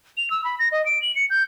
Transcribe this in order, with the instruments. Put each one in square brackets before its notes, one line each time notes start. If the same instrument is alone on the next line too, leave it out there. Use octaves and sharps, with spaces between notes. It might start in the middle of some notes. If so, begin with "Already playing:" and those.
[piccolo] F7
E6
B5
A#6
D#5
D7
F#7
C#7
G6